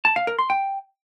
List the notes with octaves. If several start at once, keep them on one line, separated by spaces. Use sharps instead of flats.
A5
F5
A#4
C6
G5